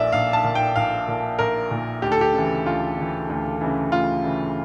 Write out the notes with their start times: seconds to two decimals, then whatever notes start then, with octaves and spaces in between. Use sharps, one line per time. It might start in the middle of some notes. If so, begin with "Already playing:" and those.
Already playing: A#1 A#2 D5 E5
0.12 A#1 F5
0.33 A5
0.44 A#2
0.55 G5
0.76 A#1 F5
1.08 A#2
1.39 A#1 A#4
1.71 A#2
2.02 D2 G4
2.12 A4
2.21 G4
2.34 C#3 E3
2.65 D2 F4
2.98 C#3 E3
3.29 D2
3.61 C#3 E3
3.92 D2 F4
4.24 C#3 E3